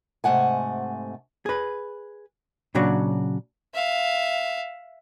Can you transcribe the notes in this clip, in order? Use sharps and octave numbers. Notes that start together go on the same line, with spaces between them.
G#2 C3 A3 F#5 G#5
G#4 B4
A#2 C#3 F#3 D4 F#4
E5 F5